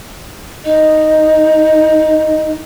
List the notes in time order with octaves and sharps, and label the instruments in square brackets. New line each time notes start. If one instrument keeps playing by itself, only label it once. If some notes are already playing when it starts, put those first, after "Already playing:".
[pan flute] D#4 [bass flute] D#5